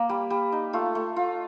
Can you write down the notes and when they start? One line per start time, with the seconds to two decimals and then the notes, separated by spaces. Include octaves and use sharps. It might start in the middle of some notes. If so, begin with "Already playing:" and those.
Already playing: A#3
0.09 G3
0.30 G3
0.52 D#4
0.73 A3 F4
0.95 A3
1.16 F4